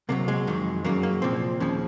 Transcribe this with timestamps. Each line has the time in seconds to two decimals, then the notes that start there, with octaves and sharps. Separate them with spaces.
0.09 C2 C3 D#3 F#3 A#3
0.28 G#3
0.47 F2 D#3 F#3
0.84 F#2 C#3 F#3 A#3
1.03 A#3
1.22 C2 A#2 F3 C4
1.60 D#2 C#3 F3